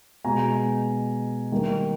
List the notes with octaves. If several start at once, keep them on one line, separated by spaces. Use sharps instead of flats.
B2 G#3 G#5 A#5
D#3 G3 A#3